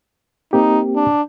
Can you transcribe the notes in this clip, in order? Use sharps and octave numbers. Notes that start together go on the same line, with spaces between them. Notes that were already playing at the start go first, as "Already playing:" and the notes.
A#3 C4 D#4 G4
D4